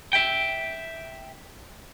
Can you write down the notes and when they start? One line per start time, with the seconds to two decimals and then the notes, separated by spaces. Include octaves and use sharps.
0.13 E5 G5